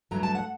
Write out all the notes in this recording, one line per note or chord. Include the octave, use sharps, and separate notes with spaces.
G2 F#3 A3 A#5
A5
F#5